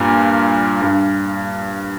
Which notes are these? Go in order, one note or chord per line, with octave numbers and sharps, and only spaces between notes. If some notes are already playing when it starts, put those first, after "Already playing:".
Already playing: G2 A#2
G2